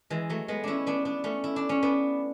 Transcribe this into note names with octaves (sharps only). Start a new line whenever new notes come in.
E3 G#3
F#3 A3
G#3 B3
C#4 D4 E4
B3 D4
B3 D4
A3 C#4
E4
D4
C#4
B3 D4